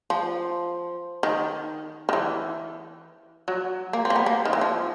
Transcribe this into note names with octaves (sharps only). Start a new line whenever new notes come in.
F3
D#3
D#3
E3
F#3
A#3
C4
A#3
B3
A#3
D#3
E3
F3